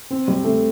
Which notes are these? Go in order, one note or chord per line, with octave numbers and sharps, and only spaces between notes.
C4
G3
A3